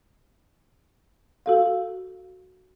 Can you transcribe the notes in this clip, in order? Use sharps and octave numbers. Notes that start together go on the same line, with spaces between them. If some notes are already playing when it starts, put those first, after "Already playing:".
F#4 A4 F5